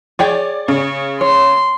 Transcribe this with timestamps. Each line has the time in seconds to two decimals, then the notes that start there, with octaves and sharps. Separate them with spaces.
0.19 G#4 C#5 D5 G5
0.68 C#3 C#4 C#6
1.21 C#5 C6